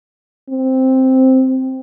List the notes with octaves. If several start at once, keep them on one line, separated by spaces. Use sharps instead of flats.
C4